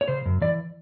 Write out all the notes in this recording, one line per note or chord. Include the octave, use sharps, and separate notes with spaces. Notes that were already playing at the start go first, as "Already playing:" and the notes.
C#5
C#3 C5
F#2
E3 D5